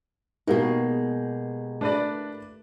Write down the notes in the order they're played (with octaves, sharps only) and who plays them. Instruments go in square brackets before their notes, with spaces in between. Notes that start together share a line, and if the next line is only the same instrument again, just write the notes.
[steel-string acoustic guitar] B2 G#3 [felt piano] A#3 G4 A#4 [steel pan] D#4 F#4 F5
[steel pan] A3 [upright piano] D4 B4 D5